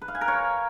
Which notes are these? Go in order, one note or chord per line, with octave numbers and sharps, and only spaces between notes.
B4
F5
G#5
A#4
C#5